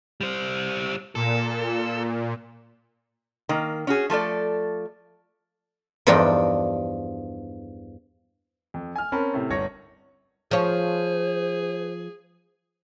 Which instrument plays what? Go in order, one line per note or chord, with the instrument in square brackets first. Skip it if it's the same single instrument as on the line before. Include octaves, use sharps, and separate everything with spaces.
[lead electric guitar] G3 C5
[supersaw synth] A#2 [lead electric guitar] A4
[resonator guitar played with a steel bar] D#3 A#3
C#4 F#4 G#4
F3 A3 A4 D5
[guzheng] E2 G2 F3 D4 D#4 G5
[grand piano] F2
G#5 F6
C4 C#4 A#4 A5 B5
A2 C3
G1 C#5 A#6
[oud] F3 C#5 [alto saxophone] G#4 [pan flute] C5